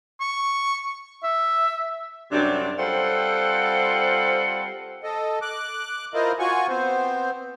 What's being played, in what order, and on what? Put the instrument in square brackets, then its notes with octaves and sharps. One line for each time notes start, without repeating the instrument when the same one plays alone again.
[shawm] C#6
E5
[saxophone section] F#2 C3 F#3 G3 D4
G3 C4 F4 A4 C5 F#5
[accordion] A4 D#5
D6 F#6
E4 F4 A#4 C5 D#5
F4 F#4 G#5 C#6
B3 C4 C5